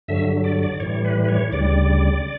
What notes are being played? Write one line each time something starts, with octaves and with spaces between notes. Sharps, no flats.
G2 D3 F#3 E5
D5
D5
A2 E3 G3 C#5
B4
B4
C#5
D2 C#3 G3 D5